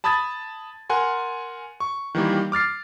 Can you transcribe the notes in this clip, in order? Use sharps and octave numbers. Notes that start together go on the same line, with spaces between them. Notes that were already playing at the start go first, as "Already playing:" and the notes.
A5 B5 D#6 G#6 A6
A#4 F#5 G#5 C6
C#6
D#3 E3 G3 A#3
D6 F6 A6 C7